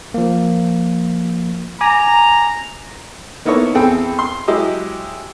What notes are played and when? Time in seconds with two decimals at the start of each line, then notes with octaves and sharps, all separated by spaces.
0.14 F3 A#3
1.81 G#5 A#5 D6
3.45 A#3 B3 D#4 E4 A4 C#5
3.75 E2 C4 G#4 A4 G5
4.19 C6
4.48 F#3 G#3 E4 G4 D#5